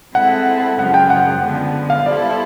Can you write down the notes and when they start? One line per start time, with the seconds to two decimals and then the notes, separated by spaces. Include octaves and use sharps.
0.15 G#3 C4 E4 A4 F#5
0.79 F#2 C#3 F3 G#3 F#5
0.94 G5
1.10 F#5
1.42 D3 F3 G#3 B3
1.90 F5
2.06 G3 B3 E4 A4 C5 D5